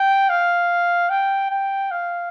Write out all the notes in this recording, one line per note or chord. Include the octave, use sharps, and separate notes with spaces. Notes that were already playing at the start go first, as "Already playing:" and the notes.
Already playing: G5
F5
G5
G5
F5